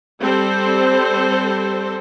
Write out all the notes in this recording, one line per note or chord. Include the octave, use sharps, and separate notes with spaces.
G3 C4 A4 C5